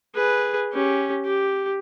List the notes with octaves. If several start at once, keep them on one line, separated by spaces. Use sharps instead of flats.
G#4 B4
C#4 G4
G4